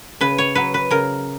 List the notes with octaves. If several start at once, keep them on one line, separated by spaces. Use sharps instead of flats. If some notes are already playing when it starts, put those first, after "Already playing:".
C#3 B4
C#5
F#3 B4
B4
C#3 A#4